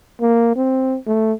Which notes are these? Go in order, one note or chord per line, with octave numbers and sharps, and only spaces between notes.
A#3
C4
A3